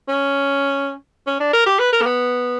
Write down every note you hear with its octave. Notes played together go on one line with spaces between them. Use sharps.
C#4
C#4
D4
A#4
G4
B4
A#4
A#3
B3